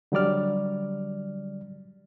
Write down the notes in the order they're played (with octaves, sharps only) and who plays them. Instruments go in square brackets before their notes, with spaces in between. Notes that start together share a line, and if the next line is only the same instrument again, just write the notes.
[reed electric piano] D3 F#3 G3 D5 F6